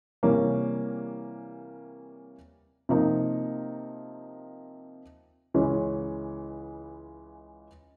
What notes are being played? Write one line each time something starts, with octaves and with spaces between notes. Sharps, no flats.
C3 E3 G3 A#3 C#4
C3 F3 A#3 D#4
C#2 C#3 E3 G#3 C#4